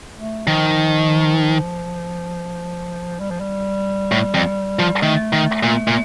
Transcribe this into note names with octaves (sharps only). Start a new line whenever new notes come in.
A3
D#3 F3
G3
F3
G3
A2
F2
F3
D#3 A3
D#3
A#2
A#2